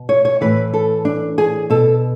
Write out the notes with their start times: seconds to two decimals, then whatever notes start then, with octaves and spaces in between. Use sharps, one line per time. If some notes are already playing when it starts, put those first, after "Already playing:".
Already playing: B2
0.09 C#5
0.25 C#5
0.41 A2 E3 B4
0.73 A4
1.05 D4
1.38 G#4
1.70 B2 A4